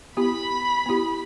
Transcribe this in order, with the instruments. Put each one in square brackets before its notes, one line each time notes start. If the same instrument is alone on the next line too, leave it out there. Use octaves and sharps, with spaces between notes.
[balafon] B3 E4 G4 [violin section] B5
[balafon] B3 E4 G4